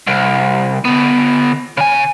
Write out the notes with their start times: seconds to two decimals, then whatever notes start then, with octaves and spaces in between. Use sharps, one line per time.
0.07 C2
0.85 D3 B3
1.77 C#3 G#5